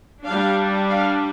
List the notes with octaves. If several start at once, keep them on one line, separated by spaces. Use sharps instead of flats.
G3 D4 F5
F5